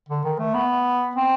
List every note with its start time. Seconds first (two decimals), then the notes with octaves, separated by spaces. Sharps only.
0.09 D3
0.24 D#3
0.39 A3
0.54 B3
1.15 C4